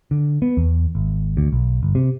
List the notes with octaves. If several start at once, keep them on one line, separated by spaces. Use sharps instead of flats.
D3
B3
E2
G#1
D2
B1
G1
C3